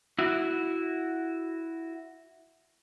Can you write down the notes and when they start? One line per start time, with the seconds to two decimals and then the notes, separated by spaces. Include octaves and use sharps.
0.19 E4 F#4